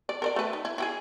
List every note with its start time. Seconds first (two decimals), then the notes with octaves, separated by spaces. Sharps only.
0.09 D5
0.22 A#4 C5 D5
0.36 A3 B4
0.53 D#4
0.65 E4
0.78 E4 G4 G#4